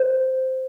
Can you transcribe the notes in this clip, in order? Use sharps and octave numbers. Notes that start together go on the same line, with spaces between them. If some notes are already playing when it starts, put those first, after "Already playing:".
Already playing: C5